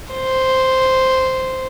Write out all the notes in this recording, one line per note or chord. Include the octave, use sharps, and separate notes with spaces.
C5